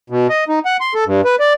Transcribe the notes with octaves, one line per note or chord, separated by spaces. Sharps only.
B2
D#5
D#4
F#5
C6
A4
G2
B4
D5